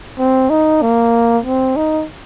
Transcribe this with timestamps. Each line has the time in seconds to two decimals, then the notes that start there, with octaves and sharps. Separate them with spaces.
0.18 C4
0.50 D#4
0.82 A#3
1.45 C4
1.76 D#4